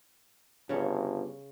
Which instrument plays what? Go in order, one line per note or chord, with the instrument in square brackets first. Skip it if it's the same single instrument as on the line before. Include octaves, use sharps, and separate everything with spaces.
[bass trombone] G1 [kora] C#3 C#4